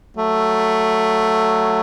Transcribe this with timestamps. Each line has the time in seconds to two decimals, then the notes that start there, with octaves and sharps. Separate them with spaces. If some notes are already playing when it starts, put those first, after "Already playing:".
0.17 F#3 A3